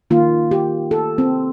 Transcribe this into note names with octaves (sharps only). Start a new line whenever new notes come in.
D#3 A#3 F4
G4
A4
C4